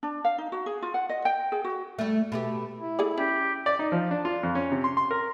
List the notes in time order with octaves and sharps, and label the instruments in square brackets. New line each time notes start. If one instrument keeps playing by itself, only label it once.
[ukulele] D4
F5
D#4
F#4
G#4
F4
F#5
D#5
G5
G#4
F#4
[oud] G3 A3
B2 A3 G4
[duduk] E4
[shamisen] A3 G#4 D5
[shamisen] C#4 [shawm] G4
[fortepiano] D5
D#4
F3
D4
F4
F2
C#4
C3
C6
C6
A#4